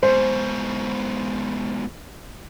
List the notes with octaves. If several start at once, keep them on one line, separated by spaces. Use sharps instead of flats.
G#2 B2 C5